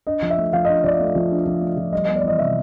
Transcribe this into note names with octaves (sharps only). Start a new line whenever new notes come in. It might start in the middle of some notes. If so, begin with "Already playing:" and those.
D4 D#5
F3
E5
A3
F3 F5
D#5
D4
F3 D5 D#5
A3
F3
D4
F3
A3
F3
G3 D#5
D#5
B3
D5
E3 D#5
C3 E5